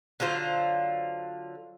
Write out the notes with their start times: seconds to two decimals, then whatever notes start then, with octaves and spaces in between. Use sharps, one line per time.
0.20 D3 F#3 F4 C5